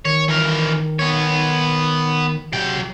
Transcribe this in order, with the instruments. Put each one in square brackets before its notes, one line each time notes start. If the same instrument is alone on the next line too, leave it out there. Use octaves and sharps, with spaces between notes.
[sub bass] D#3 [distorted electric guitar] C#5
[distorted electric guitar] E3 A#4
B3 C#5
[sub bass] C3 [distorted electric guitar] F#3 G5